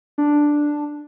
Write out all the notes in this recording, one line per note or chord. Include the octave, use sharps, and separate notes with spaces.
D4